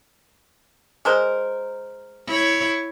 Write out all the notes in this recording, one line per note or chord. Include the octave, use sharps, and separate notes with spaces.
G#3 A#4 C5
E4 C#5